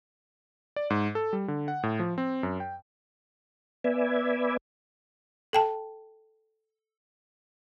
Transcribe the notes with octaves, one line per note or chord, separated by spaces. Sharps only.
D5
G#2
A4
G3
D3
F#5
A2
F3
C4
F#2
G5
B3 B4 D5 E5 G#5
A4 G5 A5